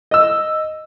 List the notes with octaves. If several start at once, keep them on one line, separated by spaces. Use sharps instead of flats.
D#5 E6